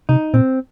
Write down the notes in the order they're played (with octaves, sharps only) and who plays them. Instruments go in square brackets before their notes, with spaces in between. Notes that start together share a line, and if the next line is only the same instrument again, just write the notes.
[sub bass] C3 [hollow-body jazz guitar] D#4
[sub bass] A#2 [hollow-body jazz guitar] C4